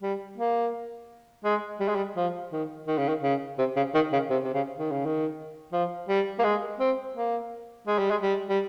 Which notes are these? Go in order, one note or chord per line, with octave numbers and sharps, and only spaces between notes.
G3
A#3
G#3
G3
G#3
G3
F3
D#3
D#3
C#3
D#3
C#3
C3
C#3
D#3
C#3
C3
C3
C#3
D#3
C#3
D#3
F3
G3
A#3
G#3
C4
A#3
G#3
G3
G#3
G3
G3